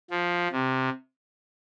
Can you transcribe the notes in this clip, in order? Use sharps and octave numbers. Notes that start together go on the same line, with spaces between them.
F3
C3